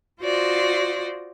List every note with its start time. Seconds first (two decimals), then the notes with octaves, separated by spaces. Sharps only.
0.21 F4 F#4 C5 D5 D#5